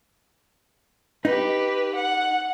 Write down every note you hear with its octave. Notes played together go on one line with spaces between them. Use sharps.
D#4 G4 B4
F#5